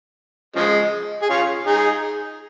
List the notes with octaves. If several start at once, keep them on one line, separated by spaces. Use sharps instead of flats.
C#3 F3 G#3
G#4
C#4 F4
D#4 G#4